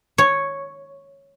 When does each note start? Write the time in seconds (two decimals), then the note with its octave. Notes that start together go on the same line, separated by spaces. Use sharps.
0.18 C#5